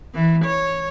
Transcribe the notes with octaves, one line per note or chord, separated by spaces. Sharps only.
E3
C#5